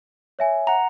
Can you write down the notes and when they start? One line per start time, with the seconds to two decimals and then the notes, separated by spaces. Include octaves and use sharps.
0.39 C#5 E5 G#5
0.67 F#5 A#5